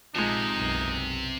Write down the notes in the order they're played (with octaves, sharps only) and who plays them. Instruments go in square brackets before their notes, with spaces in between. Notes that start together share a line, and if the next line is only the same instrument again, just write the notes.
[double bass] A#1 [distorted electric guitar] C3 [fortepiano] F3 G#3 [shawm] D#4
[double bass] F#1 B1